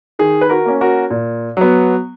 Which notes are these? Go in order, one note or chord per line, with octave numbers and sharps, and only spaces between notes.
D#3 G#4
B4
F#4 A#4
A#3 C#4
F#4 A#4
A#2
F#3 B3